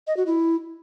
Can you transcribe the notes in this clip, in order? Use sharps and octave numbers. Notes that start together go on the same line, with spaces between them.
D#5
F#4
E4